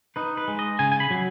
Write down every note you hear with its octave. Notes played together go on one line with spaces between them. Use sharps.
D#4 B4
B4
G#3
D#5
C#3 G#5
G#5
B5
F#3